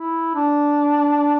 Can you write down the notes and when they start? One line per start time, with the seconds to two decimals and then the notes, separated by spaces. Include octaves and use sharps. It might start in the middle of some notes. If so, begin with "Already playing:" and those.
Already playing: E4
0.35 D4